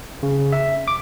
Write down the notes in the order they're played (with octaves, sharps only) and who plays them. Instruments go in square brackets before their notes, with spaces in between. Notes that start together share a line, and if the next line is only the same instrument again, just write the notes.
[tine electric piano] C#3
E5
D6